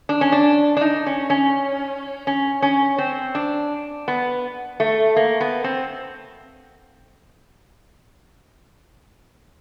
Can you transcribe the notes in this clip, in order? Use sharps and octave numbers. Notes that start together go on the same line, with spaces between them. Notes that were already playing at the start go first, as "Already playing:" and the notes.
D4
C#4
D4
D4
D#4
C#4
C#4
C#4
C#4
C4
D4
B3
A3
A#3
B3
C4